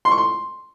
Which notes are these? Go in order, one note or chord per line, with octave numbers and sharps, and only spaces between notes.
C6
C#6
C6